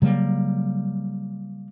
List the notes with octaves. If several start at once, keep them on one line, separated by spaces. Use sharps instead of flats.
C#3 F#3 G3 A#3